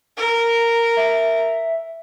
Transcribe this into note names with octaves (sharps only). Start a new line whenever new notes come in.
A#4
E5